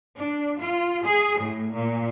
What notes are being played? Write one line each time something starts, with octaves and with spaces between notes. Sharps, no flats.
D4
F4
G#4
A2
A#2